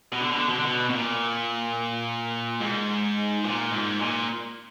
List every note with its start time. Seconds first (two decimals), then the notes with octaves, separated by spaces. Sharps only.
0.13 B2
0.21 D3
0.30 B2
0.38 D3
0.48 B2
0.56 D3
0.65 B2
0.90 B2
0.95 A#2
2.61 G#2
3.44 A#2
3.71 G#2
3.99 A#2